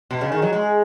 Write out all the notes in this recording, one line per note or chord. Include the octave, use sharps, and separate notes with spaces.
B2
C#3
D#3
F#3
G#3